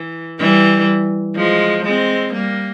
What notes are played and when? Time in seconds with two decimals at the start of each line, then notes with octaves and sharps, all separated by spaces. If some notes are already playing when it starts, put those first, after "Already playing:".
Already playing: E3
0.39 E3 G3
1.36 F3 G#3
1.85 G#3 C4
2.34 G3 A#3